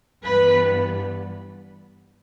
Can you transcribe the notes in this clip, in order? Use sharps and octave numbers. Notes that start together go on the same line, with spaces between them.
G2 E3 G3 B3 B4